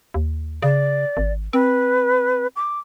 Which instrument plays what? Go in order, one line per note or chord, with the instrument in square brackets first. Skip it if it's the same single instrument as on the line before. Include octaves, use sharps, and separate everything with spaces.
[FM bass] D#2
[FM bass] C#3 [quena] D5
[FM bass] G#1
[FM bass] C4 [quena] B4
[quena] D6